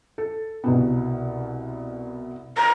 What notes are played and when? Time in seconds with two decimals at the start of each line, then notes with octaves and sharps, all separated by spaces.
0.18 A4
0.64 C2 B2 B3
2.57 A#5